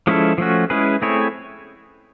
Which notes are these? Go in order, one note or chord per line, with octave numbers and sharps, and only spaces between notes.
F3 G#3 C#4 E4 A4
F3 A3 C#4 F#4
G#3 C#4 E4 G#4 B4
A3 C4 E4 G#4 C#5